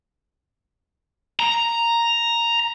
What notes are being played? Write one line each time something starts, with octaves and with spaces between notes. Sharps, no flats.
A#5